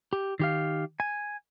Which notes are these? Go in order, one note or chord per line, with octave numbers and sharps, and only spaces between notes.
G4
D#3 G4 F5
G#5